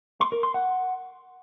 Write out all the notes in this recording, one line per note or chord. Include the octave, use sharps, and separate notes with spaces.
C6
A#4
C6
F#5